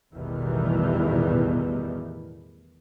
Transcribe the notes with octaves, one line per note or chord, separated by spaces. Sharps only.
A1 E2 B2 D#3 E3 G3